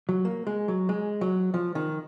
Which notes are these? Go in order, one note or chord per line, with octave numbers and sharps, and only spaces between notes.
F#3
A#3
G#3
F#3
G#3
F#3
F3
D#3